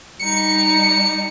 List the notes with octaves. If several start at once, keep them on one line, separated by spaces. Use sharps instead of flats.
G3 D#4 C#7